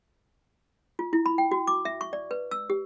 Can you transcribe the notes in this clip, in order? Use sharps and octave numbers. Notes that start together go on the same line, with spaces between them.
F4
E4
B5
G5
F#4
D6
E5
C#6
D5
B4
E6
G4